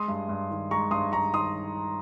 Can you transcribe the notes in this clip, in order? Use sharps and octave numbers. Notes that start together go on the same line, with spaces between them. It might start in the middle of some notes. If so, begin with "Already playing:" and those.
Already playing: G#3 C6 D#6
G2
G2
D#3
G#3 A#5 C#6
G2 C6 D#6
G2 A#5 C#6
D#3 C6 D#6